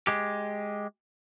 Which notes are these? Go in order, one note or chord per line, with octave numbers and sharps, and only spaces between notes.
G#3 G4